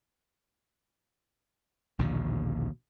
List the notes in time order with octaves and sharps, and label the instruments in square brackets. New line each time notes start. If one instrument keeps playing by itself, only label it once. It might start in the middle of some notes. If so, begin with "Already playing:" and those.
[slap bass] A#1 D#2 B2 D3